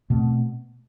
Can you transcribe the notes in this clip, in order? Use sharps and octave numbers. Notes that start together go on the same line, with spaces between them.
B2 A3 C4